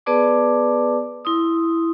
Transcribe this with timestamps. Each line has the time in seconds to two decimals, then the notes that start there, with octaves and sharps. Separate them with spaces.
0.06 B3 G#4 B4 D5 A5 D6
1.25 E4 C6 D#6